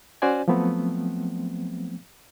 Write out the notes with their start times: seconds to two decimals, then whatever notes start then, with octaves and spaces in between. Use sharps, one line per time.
0.22 C#4 F#4 C5 D5 G#5
0.48 F3 F#3 A3 B3 C4